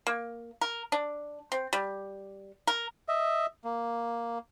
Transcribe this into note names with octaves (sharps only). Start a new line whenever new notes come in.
A#3
A#4
D4
C4
G3
A#4
D#5 E5
A#3